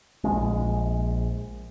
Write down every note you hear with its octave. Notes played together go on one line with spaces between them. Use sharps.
A#1 G#3